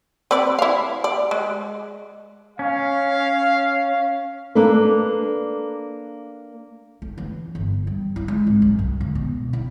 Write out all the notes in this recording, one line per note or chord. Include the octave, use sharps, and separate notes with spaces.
C4 B4 D5
E4 F5
D5
G#3
C#4 F5
A#3 D4 A4 B4
A3
E3
G1
G3
E4
G#3
G#1
F#2
C2
D2
B2
E4